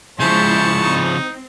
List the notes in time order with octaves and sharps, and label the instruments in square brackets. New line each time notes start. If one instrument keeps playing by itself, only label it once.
[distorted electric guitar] C#3 F3 [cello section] G#3 C4 E4 [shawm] C5 [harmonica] A5 C#6
[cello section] C4 [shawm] D#4